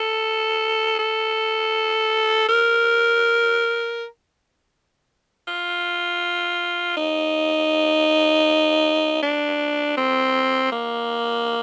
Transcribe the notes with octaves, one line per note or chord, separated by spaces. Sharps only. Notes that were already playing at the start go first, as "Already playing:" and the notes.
Already playing: A4
A4
A#4
F4
D#4
D4
C4
A#3